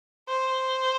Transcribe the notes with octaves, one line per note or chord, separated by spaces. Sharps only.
C5